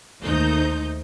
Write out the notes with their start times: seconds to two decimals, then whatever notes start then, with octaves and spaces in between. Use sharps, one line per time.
0.22 D#2 A3 D#4 C5 G6